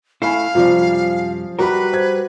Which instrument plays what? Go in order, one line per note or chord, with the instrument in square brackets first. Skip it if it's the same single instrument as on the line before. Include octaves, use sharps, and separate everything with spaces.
[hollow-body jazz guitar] A3 E4 [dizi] F5 [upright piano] G#5 B5 C7
[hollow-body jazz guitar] F#2 C3 G3 [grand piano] F3
[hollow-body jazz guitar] G3 A#4 [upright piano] F#4 B5 [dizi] B4
[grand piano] C5 G#6